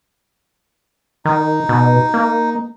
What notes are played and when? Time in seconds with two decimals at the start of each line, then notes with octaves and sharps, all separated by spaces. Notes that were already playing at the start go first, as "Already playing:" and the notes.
1.25 D#3 D#4
1.69 B2
2.14 A#3